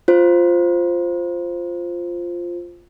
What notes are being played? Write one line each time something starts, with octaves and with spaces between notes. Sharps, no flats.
F4 C5